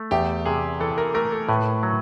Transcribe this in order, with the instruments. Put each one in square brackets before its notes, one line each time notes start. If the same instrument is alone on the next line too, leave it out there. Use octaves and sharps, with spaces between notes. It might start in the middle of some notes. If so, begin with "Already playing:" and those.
Already playing: [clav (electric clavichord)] A3
[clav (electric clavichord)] E2 [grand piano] G4
[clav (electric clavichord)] C3 [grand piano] G#4
[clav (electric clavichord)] E3 [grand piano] A4
[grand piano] A#4
[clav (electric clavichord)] A3 [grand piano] A#4
[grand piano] A4
[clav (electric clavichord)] A2 [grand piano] B4
[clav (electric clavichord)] F#3